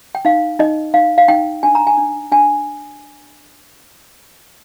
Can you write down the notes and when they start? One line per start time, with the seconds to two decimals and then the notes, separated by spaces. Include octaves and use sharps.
0.15 G5
0.25 D#4 F5
0.59 D#4 D#5
0.94 D#4 F5
1.18 F5
1.28 D#4 G5
1.63 D4 G#5
1.75 A#5
1.87 G#5
1.98 D4
2.32 D4 G#5